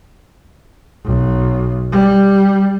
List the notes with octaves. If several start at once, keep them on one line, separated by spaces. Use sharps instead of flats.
B1
G3